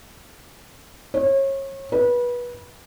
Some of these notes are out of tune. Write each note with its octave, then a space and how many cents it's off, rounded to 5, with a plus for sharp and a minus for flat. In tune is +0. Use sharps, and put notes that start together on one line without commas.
C#5 -30
B4 -25